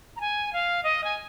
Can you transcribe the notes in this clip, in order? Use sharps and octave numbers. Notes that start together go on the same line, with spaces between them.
A#5
G#5
F5
D#5
G#5